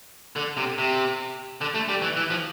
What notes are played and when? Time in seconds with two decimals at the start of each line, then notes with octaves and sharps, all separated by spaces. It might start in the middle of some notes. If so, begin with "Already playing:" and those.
0.36 D3
0.57 C3
0.78 C3
1.61 D3
1.74 A3
1.88 G3
2.02 E3
2.17 E3
2.30 F3